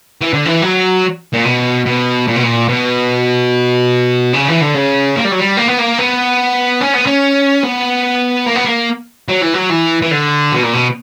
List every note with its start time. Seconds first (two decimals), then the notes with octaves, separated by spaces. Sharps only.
0.21 E3
0.33 D3
0.46 E3
0.62 F#3
1.33 A#2
1.45 B2
1.86 B2
2.27 A#2
2.36 B2
2.43 A#2
2.69 B2
4.34 C#3
4.49 E3
4.62 D3
4.75 C#3
5.16 A#3
5.24 G3
5.31 F#3
5.39 G3
5.57 A#3
5.68 B3
5.79 A#3
5.99 B3
6.81 C#4
6.94 B3
7.06 C#4
7.64 B3
8.46 A#3
8.55 B3
8.65 A#3
9.29 F#3
9.42 E3
9.54 F#3
9.70 E3
10.02 E3
10.11 D3
10.52 B2
10.63 A#2
10.73 B2